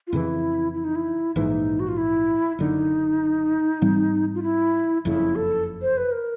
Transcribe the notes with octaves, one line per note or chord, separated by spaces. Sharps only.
F4
F2 C#3 E3 E4
E4
D#4
E4
A#1 G#2 E3 D#4
F#4
F4
E4
F#1 F#2 D3 D#4
G#2 E3 G3 C4
F4
E4
F#1 F2 C#3 E4
A4
C5
B4
A#4